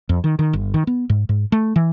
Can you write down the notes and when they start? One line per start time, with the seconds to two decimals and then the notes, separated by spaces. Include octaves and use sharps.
0.09 F2
0.24 D#3
0.39 D#3
0.53 G1
0.74 D#3
0.87 B3
1.09 G#2
1.29 G#2
1.52 A3
1.76 E3